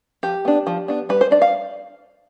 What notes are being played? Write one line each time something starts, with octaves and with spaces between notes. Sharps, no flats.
F3 G4
B3 D4
F3
B3 D4
G3 B4
C5
D4 D5
F5